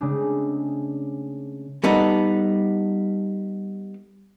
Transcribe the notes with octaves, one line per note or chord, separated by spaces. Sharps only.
C#3 G#3 A3 C4 D4
G3 B3 D#4 A4